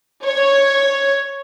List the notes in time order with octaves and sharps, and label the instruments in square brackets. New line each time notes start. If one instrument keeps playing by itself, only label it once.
[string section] C#5